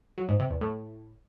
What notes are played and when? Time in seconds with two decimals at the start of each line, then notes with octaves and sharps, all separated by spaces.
0.18 F#3
0.29 G#2
0.39 C3
0.50 E2
0.61 A2